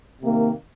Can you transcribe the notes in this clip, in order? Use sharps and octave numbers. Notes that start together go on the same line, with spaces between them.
C3 D#3 A#3